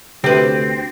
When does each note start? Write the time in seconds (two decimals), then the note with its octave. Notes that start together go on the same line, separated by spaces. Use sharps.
0.24 D2 C3 C4 G4 B4